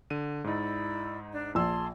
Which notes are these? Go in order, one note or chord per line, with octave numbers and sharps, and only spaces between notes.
D3 D#7
G#2 D#4 E4 D5 E6
D4
A#1 G#4 A5 C6 E6